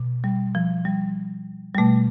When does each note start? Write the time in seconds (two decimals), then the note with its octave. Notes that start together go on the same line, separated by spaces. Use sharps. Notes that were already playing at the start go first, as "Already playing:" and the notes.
Already playing: B2
0.24 G3
0.55 F3
0.85 G3
1.74 G3
1.78 B2 A3